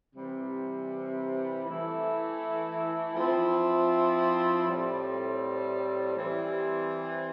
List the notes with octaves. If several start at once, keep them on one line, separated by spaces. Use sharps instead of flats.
C3 E3 G3
E3 A3 E4
F3 C4 E4
A2 G3 C4
E3 G3 C4